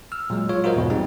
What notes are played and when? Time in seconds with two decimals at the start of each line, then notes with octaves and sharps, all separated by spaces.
0.12 E6 F6
0.30 A#2 F#3 G#3
0.49 F4 C#5
0.64 F4 F#4 A#4 C5 D#5
0.76 E2 G#2 B2
0.90 G3 B3 C4 D#4 G#4